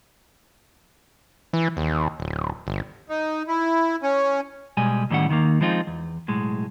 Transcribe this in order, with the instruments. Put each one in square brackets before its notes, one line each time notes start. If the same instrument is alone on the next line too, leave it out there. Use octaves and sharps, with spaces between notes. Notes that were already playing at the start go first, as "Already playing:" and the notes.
[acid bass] E3
D#2
D1
G1
[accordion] D#4
E4
C#4
[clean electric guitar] B2 G3 G#3 G#5
A2 D#3 G3 C#4 F#5
D#2 D#3 A#3
F3 G#3 C4 D#4 F4
E2
B1 A2 G#3